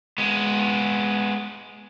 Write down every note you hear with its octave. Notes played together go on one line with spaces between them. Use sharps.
G#3 B3